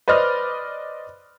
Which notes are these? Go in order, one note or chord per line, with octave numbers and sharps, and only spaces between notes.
B4 C5 D5 D#5 F6